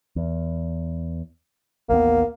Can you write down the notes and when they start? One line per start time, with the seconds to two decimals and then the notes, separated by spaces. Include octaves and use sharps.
0.16 E2
1.89 A1 D#2 A#3 B3